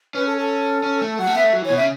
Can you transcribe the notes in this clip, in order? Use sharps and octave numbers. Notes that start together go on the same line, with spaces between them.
C#4 B4
A4
A4
C#4
A3
F#3 F#5
A3
B3 E5
A3
F#3
E3
C#5
B2
E5
C#3